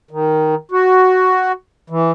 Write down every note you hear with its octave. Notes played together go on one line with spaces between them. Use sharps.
D#3
F#4
E3